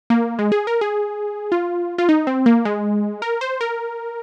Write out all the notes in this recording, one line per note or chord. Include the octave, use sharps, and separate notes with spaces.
A#3
G#3
G#4
A#4
G#4
F4
F4
D#4
C4
A#3
G#3
A#4
C5
A#4